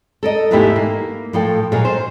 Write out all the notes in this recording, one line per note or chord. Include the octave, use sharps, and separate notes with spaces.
A4 A#4 D#5
E2 G#2 B2 A3 E4 G4
A#3
A2 F3 A4 G5
A#2 F#3 D#4 G#4 A#4
C5